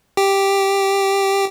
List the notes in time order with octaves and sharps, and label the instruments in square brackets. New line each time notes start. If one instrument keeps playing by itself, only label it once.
[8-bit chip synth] G4